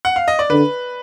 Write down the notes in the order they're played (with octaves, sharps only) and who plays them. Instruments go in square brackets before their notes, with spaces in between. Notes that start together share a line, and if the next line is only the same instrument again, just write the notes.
[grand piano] F#5
F5
D#5
D5
[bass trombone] D3 [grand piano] B4